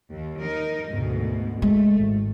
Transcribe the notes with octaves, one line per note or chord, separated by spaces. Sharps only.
D#2
D#4 A#4
D2 G#2 B2
G#3 A3
G#1